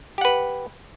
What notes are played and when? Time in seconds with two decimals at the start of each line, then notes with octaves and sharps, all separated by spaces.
0.18 G4
0.21 F#5
0.25 B4